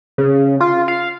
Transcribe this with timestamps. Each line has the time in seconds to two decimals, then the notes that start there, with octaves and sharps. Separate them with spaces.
0.18 C#3
0.61 F4
0.88 F5